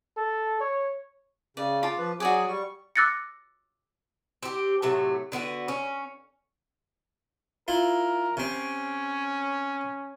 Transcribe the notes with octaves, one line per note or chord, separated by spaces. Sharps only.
A4
C#5
C#3 D5
F4 A5 D6
F3 B4
F#3 F#4 G#4 D5 G#5 D6
G3 C#6
D6 E6 F#6 A6 A#6 C#7
C4 G4
A2 C3 F#3 A3
D3 B3 E4 F#4
C#4
E4 F4 A#4
C3 C4 C#4